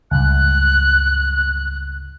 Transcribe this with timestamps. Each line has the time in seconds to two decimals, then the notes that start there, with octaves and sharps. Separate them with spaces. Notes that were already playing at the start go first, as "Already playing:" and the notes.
0.11 C#2 G2 F#6